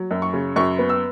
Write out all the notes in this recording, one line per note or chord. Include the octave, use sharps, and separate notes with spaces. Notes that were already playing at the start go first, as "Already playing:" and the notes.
Already playing: F#3
F#2
C#6
C#3
F#2 C#6
B3
E6